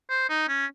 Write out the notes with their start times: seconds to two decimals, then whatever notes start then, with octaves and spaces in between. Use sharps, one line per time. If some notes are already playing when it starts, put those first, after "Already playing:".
0.10 C5
0.29 D#4
0.48 C#4